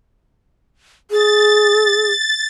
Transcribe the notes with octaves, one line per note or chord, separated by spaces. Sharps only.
G#4 A6